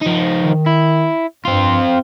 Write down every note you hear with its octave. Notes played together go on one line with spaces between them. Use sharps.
F3 D#4
D#3
E4
G2 C4 F4